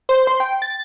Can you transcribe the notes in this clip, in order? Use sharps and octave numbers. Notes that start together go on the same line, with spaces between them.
C5
C6
G5
A6